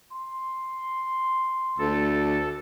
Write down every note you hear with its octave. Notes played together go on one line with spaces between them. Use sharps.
C6
D2 A4